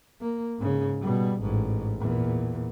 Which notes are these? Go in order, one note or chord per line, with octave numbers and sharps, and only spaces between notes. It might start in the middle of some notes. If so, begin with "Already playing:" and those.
A#3
G#2 C#3
B2 G3
A1 G#2
E2 A#2